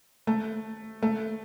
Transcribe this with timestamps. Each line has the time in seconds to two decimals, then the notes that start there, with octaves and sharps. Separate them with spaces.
0.27 A3
1.02 A3